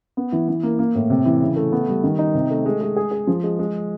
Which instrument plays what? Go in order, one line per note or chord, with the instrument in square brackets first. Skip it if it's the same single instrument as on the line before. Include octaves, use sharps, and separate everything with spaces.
[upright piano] B3
E3
E3
A#3
A#3
A2
C3
E3
C#3
A3
B3
G3
D#3
D#4
C3
A3
G#3
G#3
G#4
G#4
F3
G#3
G#3